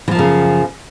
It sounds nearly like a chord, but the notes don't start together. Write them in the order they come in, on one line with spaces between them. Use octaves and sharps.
E3 F3 F#2 C#3